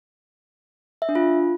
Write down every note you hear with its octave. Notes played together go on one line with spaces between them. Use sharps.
E5
D4
F4